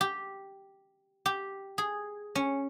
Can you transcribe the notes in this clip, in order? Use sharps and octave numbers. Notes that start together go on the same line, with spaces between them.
G4
G4
G#4
C#4